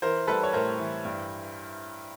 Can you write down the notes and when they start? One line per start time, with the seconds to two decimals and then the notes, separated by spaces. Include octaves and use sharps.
0.02 E3 A#4 C5
0.27 G3 A4 B4
0.43 C#5
0.53 A2 A#4 C5
0.79 E3
1.05 G2